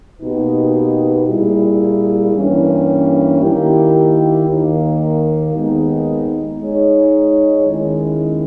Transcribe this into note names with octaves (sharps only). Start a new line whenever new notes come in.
B2 A#3 D#4 G4 B4
A#2 G3 A#3 E4 G#4
G2 E3 A#3 C#4
D#3 A#3 E4 G4
D#2 D#3 A#3
D#2 D#3 G#3 B3 D#4
G#3 D#4 G#4 C#5
D#2 D#3 G#3 C#4 E4